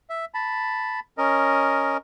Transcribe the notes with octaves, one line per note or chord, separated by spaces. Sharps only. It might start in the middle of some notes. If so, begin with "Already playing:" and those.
E5
A5 B5
C#4 A#4 D#5